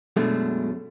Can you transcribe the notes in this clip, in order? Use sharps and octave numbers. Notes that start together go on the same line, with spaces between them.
F#2 B2 G#3 A3 D4